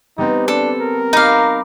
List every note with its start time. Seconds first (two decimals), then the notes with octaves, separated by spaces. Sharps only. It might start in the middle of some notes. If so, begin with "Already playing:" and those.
0.18 G3 B3 C4 D#4
0.48 D4 A4
0.80 A#4
1.13 D#4 F5 A#5 B5 D6